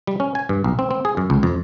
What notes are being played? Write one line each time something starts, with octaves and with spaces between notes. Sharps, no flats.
G3
C#4
G#5
G2
B1
C4
C4
G#4
F#2
C#2
F2